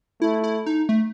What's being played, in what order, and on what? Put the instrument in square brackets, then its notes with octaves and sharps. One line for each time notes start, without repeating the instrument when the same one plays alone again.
[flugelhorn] A3 [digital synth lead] E4
[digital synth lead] E4
D#4
A3